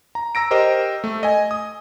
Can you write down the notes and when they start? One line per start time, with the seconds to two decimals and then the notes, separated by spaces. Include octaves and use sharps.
0.15 A#5
0.35 A#5 E6 A#6 D7
0.51 G4 A#4 C5 D#5
1.04 A3
1.23 D#5 G#5
1.51 D#6